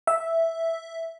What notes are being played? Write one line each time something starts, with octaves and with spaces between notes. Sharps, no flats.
E5